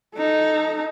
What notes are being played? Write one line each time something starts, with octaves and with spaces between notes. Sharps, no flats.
D#4 A4